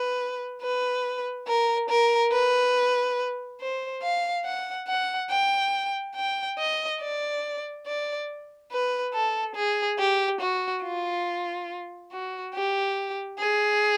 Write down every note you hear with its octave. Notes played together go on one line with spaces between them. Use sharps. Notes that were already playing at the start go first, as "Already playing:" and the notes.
Already playing: B4
B4
A#4
A#4
B4
C5
F5
F#5
F#5
G5
G5
D#5
D5
D5
B4
A4
G#4
G4
F#4
F4
F#4
G4
G#4